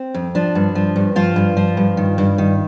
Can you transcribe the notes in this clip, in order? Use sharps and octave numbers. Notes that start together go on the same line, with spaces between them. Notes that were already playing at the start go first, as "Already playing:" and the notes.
Already playing: C4
F2
F3 D4
G2
F3
G2
F3 F4
G2
F3
G2
D#3
G2
D#3